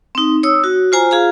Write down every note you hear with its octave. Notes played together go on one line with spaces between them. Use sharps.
C4 D#4
C#5 D#6 E6
F#4
F4 C5 G#5 A#5
F4 G#4 F5 A#5